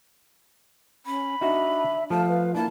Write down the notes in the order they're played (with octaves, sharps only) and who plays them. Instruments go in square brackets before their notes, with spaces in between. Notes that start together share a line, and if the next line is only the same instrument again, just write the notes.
[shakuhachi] C#4 [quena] B5
[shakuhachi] D4 [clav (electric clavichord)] D#4 F#4 [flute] E5
[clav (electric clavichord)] F3 A3 [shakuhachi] F5 [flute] A5
[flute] B4
[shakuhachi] A#3 [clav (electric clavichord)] D4 [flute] E4 [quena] A5